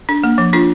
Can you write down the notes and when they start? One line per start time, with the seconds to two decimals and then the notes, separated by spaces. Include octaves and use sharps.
0.09 D4
0.24 A#3
0.38 F3
0.53 D4 F4